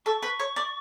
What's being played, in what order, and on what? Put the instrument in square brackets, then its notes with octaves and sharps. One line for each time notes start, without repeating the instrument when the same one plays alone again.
[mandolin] A4 [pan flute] C#6
[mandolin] B4
C#5
D5